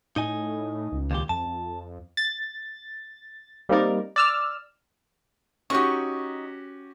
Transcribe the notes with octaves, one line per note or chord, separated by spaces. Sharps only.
A2 D#4 D#5 G#5
C#2
D#2 A#2 G4
F2 A5
F2
A6
G3 A#3 C4 D#4 A#4 D5
D5 E6 F6
C#4 D#4 F#4 G4 C#6